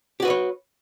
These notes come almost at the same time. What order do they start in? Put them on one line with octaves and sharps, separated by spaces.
G4 F#4 B4 D5 C#5